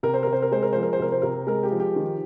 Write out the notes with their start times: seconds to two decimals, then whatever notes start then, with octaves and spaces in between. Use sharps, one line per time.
0.03 C3 A#4
0.14 C5
0.23 C3 A#4
0.33 C5
0.42 A#4
0.52 G#3 C5
0.63 A#4
0.73 F3 C5
0.83 A#4
0.93 C5
0.99 C3 A#4
1.12 C5
1.22 C3 A#4
1.47 G#3 A#4
1.63 G4
1.71 F3
1.80 G4
1.96 D#3